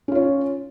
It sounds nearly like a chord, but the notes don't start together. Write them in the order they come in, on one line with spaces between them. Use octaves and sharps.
C#4 F4 C#5